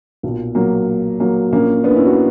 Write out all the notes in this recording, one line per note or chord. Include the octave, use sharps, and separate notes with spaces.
B1 A#2
F#3 A#3
F#3 A#3
A#1 A#2 A#3 C#4
B3 D4
C#4 E4
D4 F#4